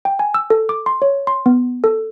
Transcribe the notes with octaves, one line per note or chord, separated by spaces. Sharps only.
G5
G#5
E6
A4
D6
C6
C#5
C6
B3
A4